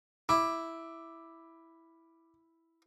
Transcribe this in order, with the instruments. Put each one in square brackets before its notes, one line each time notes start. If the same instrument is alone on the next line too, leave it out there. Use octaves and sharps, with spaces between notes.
[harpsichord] E4 [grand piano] D6